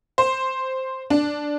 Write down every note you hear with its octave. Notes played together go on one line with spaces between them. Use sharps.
C5
D4